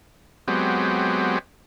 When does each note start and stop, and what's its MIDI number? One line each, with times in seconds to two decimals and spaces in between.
0.48 1.39 54
0.48 1.39 56
0.48 1.39 59
0.48 1.39 60
0.48 1.39 67